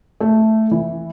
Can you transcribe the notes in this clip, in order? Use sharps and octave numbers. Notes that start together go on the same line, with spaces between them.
A3
E3